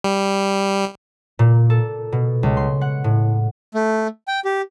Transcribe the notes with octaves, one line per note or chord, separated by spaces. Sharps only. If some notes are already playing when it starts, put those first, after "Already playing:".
G3
A#2
A4
B2
C#2
C6
F#5
A2
A3
G5
G4